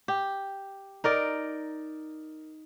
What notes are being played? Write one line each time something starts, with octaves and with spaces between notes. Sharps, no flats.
G4
D#4 A#4 D5